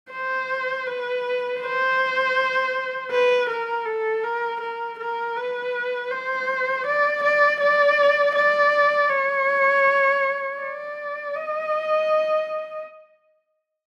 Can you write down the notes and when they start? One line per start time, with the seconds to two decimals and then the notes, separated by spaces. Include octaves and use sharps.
0.12 C5
0.87 B4
1.61 C5
3.11 B4
3.49 A#4
3.85 A4
4.24 A#4
4.61 A#4
4.99 A#4
5.36 B4
6.11 C5
6.86 D5
7.23 D5
7.61 D5
8.35 D5
9.10 C#5
10.61 D5
11.35 D#5